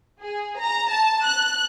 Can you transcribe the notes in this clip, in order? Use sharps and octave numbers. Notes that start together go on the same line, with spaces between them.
G#4
A#5
A5
F#6